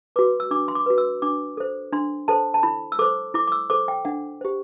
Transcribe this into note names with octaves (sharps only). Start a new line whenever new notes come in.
F#4 B4 D6
E6
D4 D6
C6
D6
F#4 B4
E6
D4 D6
A4 C5
D4 C6
A4 C5 A5
A5
E4 B5
E6
A4 C5 D6
E4 D6
D6
E6
A4 C5 D6
G5
D4 F#5
G4 C5